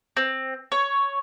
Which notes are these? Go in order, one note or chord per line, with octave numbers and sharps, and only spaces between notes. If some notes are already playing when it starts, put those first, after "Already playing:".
C4
C#5